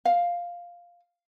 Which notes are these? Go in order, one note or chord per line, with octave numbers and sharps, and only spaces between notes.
F5